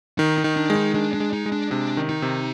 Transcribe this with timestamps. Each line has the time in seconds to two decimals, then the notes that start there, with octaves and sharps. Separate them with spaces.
0.19 D#3 D#4
0.38 D#4
0.44 D#3
0.57 D4
0.70 G#3
0.76 D#4
0.95 G#3 D4
1.14 D4
1.20 G#3
1.33 D#4
1.46 G#3
1.52 D4
1.71 C3 D4
1.97 D#3
2.09 D#4
2.22 C3